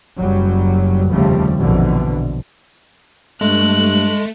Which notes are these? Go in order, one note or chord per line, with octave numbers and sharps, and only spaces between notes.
F#1 F#3 G3
F1 D#2 C#3 F3 G3 A3
A#1 F2 B2 D3 E3
G2 G#3 A3 F#6